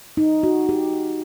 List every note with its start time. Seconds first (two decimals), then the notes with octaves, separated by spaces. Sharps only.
0.17 D#4
0.43 F#4
0.69 G4